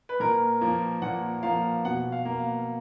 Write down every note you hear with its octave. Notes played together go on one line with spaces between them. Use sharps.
B4
A#2 A#4
F3 A#3
A#2 F#5
F3 A#3 F5
B2 F#5
F5
A#3
F5